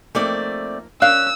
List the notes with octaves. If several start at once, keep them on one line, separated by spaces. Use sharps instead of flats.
F3 A3 A#3 C4 D#4 D5
C#4 D4 A#4 F5 E6 F#6